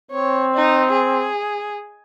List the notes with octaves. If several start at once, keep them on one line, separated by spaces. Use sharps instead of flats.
C4 C#5
D#4
G#4